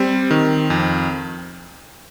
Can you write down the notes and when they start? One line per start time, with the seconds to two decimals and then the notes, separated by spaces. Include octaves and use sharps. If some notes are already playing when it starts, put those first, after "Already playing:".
Already playing: G3 C4
0.31 D#3
0.70 F2